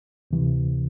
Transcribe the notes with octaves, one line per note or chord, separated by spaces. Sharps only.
D2 C3 E3